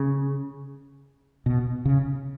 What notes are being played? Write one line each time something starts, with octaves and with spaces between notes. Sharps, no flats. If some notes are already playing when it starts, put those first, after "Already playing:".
Already playing: C#3
B2
C#3